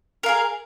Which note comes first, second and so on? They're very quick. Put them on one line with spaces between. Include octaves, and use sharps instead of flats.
A#4 F5 G#4